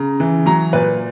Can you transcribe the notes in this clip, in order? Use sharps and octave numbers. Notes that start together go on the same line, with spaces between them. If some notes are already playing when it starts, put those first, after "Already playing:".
Already playing: C#3 A#5
E3
F#3 A#5
A#2 B4